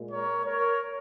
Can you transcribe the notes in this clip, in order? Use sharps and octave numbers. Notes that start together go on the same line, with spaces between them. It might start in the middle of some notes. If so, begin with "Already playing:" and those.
Already playing: A#2 G#3
A#4 C#5
A#4 C#5